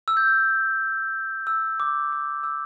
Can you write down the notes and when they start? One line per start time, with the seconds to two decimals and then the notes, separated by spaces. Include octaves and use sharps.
0.08 E6
0.17 G6
1.47 E6
1.80 D6
2.12 D6
2.43 E6